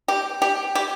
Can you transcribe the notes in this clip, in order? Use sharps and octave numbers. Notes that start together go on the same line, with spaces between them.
G4
G4
G4